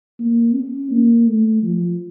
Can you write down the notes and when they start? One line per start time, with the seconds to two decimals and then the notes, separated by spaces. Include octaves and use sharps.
0.19 A#3
0.55 C#4
0.91 A#3
1.27 A3
1.63 F3